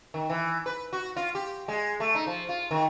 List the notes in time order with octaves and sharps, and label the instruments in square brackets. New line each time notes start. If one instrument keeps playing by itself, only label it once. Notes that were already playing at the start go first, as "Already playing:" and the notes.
[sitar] D#3
E3
B4
F#4
F4
G4
G#3
A3
D#4
F3
F4
D#3